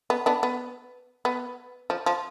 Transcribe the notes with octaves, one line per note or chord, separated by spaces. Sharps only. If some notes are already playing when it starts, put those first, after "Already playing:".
B3
B3 D4
B3
B3
F3
F3